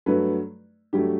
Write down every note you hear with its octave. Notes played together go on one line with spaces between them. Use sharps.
G2 F#3 A3 B4
G2 F#3 A3 G4